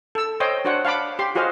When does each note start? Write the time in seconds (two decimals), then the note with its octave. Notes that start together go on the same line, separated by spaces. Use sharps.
0.15 A4 E6
0.40 C5 C#5 D#5 G5 C6
0.65 D4 F#4 C5 C#5 F#5
0.85 F5 F#5 A5 B5 D6
1.19 G4 C6
1.35 F4 F#4 G#4 C5 D#5 F5